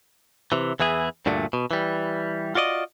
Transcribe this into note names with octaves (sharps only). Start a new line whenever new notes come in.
C3 E3
E2 E3 E4 G#4
D2 G2 A#2 D3 A3
B2
E3 G3
F4 F#4 D5 D#5